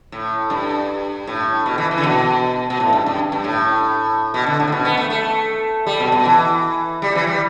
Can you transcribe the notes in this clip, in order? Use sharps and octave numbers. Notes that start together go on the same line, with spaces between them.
A2
G2
A2
B2
E3
E3
D3
B2
B2
A2
G2
G2
G2
A2
B2
D3
A2
D3
B2
B3
A3
A3
G3
B2
B2
E3
G3
E3
G3